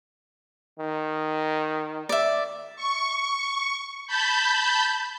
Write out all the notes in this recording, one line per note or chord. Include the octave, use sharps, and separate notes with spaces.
D#3
D5 E5
C#6
A5 B5 G6